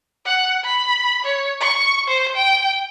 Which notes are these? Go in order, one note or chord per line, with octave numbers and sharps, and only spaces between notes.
F#5
B5
C#5
C#6
C5
G5